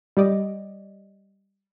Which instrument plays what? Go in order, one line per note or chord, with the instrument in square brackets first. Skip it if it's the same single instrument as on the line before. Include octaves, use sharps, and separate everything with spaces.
[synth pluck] G3 G4 D5 D#5